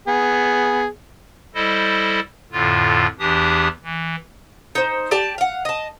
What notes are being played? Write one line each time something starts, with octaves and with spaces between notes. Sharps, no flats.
B3 G#4
G3 E4 A4 C5 D#5
F2 A2 D3 F4
E2 E3 D4 G4 D#6
E3
D#4 C5
G4 D5 G5 A5
F5 F#5
D#5 A5